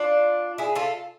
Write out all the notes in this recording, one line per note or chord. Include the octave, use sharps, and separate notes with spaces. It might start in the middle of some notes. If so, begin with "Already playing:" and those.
Already playing: D4 F4
E4 G#4
F4 A4